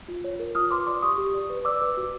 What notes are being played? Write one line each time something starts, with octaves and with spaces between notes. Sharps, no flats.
F4
C#5
A#4
F4 D#6 F6
B4 C6 D6
D5 C6 D6
G4 C#6 D#6
G4
D5
B4
D5 D6 E6
B4
F#4